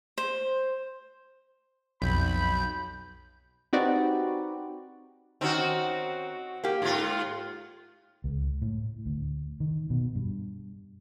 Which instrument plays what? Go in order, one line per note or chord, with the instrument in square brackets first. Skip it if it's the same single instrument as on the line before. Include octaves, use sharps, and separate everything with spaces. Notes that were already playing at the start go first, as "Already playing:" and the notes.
[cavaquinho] C5
[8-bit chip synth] B1 [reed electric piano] F2 [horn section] B5 [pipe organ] G6
[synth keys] C4 D#4 F#4 G4 B4 D5
[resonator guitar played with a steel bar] D#3 C#4 D#4 [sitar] C4 F#4
[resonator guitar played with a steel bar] A#3 G4
[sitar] G#2 F4
[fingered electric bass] C#2
A2
D2
D#3
B2
G2